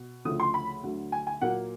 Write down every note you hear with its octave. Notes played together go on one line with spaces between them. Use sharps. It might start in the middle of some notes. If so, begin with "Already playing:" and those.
Already playing: B2
D2 C#3 F3 A3 D#6
C6
B5
D2 D3 F#3
G#5
G#5
A#2 F#3 A#3 F#5